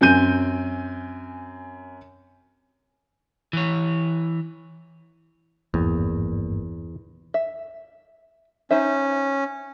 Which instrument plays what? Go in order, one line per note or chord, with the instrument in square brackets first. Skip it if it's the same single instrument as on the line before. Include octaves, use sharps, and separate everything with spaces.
[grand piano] F#2 C4 G#5 G6 D#7
[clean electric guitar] E3 C#5
[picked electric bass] G#1 G2 A#3 [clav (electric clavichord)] E2
[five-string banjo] E5
[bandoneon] C#4 [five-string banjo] D#4 C5 E5